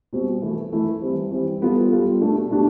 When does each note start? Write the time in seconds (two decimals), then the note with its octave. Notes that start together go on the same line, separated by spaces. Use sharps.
0.13 B2 G3 C4
0.42 E3 A3 E4 A4
0.73 E3 A3 E4 A4
1.02 E3 G3 C4
1.31 E3 G3 C4
1.61 G3 B3 F4 A4
1.91 G3 B3 F4 A4
2.21 B2 A3 D4 G4
2.50 B2 A3 D4 G4